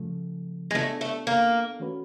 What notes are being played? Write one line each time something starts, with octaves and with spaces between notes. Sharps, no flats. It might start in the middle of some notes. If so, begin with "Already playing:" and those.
Already playing: C#3 F3 A3
G#3
A3 B3 D4 F4 A4
A3
A#3
E3 A3 C#4 F#4 B4